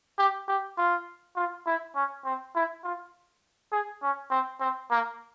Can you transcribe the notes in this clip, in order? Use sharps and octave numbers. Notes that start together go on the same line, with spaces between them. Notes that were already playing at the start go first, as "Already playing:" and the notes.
G4
G4
F4
F4
E4
C#4
C4
E4
F4
G#4
C#4
C4
C4
A#3